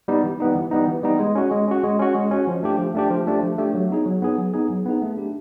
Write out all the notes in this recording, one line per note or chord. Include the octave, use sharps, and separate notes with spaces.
G3 B3 D#4
E3
G3 B3 D#4
E3
G3 B3 D#4
E3
G3 B3 D#4
G#3
C#4 F#4
G#3
C#4 F#4
G#3
C#4 F#4
G#3
C#4 F#4
F3
A3 D4 G4
F3
A3 D4 G4
F3
A3 D4 G4
F3
A3 D4 G4
F#3
B3 D#4 G#4
F#3
B3 D#4 G#4
F#3
B3 D#4 G#4
F#3
B3 D#4 G#4
A3
D4 G4